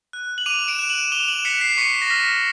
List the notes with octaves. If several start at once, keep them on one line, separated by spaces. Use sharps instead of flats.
F#6
F#7
D6 D#7 F7
D7 E7
F#6
E7 F#7
D6 F7 G7
E7 F#7
F#6 B6 C#7
C7
C#6 B6 C#7
A#6
F6 B6